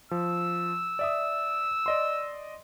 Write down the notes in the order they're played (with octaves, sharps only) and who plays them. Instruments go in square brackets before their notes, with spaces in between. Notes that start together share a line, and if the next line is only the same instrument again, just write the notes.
[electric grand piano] F3 [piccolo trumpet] E6
[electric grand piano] D5 E5 D#6
D5 D#5 C6